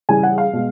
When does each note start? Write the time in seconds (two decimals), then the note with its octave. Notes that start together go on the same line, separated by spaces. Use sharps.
0.09 C#3 E3 G3 G#5
0.23 F#5
0.38 F5
0.53 B2 G#3